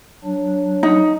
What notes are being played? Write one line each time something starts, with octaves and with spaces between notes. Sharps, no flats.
F#3 D4
D#4